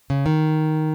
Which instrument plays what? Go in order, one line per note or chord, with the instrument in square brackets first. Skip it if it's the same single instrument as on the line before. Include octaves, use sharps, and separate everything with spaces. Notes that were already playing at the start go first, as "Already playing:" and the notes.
[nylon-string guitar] C#3
D#3